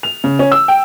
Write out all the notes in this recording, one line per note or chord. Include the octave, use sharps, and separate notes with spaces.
F7
C#3
C#4
E6
G5